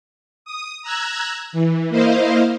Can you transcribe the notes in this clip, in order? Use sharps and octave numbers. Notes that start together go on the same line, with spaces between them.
D#6
A#5 E6 F#6 G#6
E3
A#3 E4 C5 D#5 F5